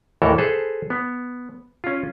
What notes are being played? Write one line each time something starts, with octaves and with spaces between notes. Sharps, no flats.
D#2 A2 E3 A4 A#4
G#4 A4 B4 C5
B3
C#4 F4